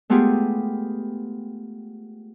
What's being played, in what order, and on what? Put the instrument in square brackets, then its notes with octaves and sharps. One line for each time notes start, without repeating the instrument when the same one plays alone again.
[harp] G#3 A3 B3 F4 G4 G#4